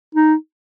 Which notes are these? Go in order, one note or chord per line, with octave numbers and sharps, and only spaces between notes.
D#4